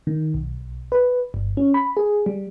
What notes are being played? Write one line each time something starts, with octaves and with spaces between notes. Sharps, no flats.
D#3
B1
B4
G1
C#4
B5
G#4
G3